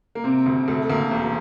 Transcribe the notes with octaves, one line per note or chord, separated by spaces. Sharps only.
A#3
C3 C4
D2
D2 A3
A3
D2 A#3
E1